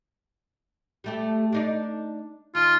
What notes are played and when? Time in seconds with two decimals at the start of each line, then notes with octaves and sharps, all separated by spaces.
1.04 G3 A3 G4
1.52 D4 D#4 D5
2.55 D#2 F4